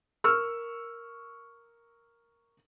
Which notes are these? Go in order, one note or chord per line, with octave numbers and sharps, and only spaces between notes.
A#4 C#6 E6 F6